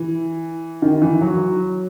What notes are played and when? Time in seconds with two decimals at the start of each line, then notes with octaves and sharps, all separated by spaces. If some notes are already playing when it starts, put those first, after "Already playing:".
Already playing: E3
0.82 D#3
1.02 E3
1.21 F#3